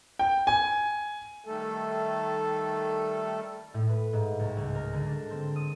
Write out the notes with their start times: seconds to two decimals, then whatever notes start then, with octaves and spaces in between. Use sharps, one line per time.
0.19 G5
0.47 G#5
1.45 D#3 G3 A3 A4
3.74 A2
3.89 B4
4.13 G#2
4.39 C2
4.57 C#2
4.75 A#4
4.93 D3
5.07 D4
5.30 C4
5.56 D#6